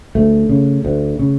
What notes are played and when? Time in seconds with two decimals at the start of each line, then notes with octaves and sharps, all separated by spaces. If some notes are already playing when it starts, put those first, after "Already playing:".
0.15 D2 A3
0.49 C#3
0.85 D2
1.19 C#3